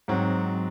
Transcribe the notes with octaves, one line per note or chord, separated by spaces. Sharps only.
G#2 F#3 C4 F#4